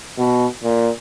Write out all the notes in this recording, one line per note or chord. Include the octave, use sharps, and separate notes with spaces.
B2
A#2